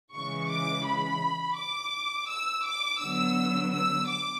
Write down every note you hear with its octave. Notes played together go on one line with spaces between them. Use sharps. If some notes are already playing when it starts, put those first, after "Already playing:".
C#3 E3 G#3 C#6
D6
B5
D6
E6
D6
D3 F#3 B3 E6
E6
D6